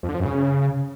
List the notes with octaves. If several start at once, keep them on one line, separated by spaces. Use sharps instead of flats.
F2
D3
F3
F#2
C#3